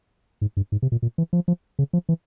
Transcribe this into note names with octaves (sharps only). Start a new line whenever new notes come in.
G#2
G2
G#2
C3
A#2
A#2
E3
F3
F3
C#3
F3
E3